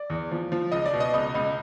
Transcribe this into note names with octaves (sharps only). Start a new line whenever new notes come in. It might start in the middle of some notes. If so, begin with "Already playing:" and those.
Already playing: D5
E2
F3
F3
C#2 D#5
D5
B2
D#5
C#2 D#5
C#2 D#5